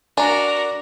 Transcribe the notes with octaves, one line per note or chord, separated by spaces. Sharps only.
D4 F#4 A#4 G#5 A#5